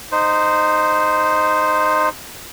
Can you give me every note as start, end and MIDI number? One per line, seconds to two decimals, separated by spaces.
0.12 2.09 63
0.12 2.09 72